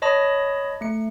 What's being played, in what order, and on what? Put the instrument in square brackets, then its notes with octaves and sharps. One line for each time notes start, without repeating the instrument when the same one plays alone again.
[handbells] C#5 D#5 A5 B5 D#6 A#6
A3 C#7